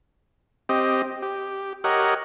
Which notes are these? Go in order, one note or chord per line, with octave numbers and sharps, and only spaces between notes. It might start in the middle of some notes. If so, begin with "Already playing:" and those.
C4 G4 D#5
G4
G4 A#4 C#5 D#5 F#5